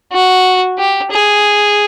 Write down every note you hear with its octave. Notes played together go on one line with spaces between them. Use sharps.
F#4
G4
G#4